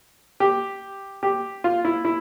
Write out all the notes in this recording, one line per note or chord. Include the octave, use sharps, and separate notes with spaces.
G4
G4
F4
E4
E4